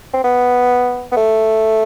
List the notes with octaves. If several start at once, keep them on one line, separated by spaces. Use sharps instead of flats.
C4
B3
B3
A3